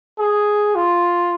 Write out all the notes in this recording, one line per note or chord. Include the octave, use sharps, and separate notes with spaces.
G#4
F4